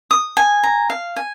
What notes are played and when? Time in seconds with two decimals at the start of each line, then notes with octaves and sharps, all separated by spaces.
0.11 D#6
0.37 G#5
0.63 A#5
0.90 F5
1.16 G#5